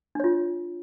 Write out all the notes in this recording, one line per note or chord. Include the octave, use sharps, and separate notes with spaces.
D4 F4 C#5